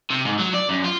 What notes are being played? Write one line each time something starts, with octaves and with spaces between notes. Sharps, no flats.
C3
G#2
F#3
D5
F#2
F4